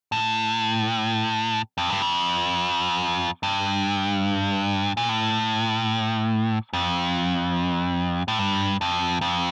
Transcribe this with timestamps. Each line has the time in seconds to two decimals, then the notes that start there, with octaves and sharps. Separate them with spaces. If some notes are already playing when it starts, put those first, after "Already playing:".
0.12 A2
1.78 F2
1.90 G2
2.02 F2
3.43 G2
4.97 A#2
5.09 A2
6.73 F2
8.28 A2
8.39 G2
8.81 F2
9.21 F2